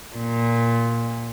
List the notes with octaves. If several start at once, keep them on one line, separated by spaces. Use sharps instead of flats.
A#2